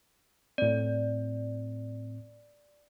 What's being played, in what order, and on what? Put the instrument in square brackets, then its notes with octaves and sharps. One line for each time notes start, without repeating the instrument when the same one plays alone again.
[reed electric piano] A2 C4 [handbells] D5